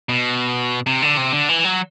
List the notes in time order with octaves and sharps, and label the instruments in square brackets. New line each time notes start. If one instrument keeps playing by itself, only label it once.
[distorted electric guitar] B2
C3
D3
C3
D3
E3
F#3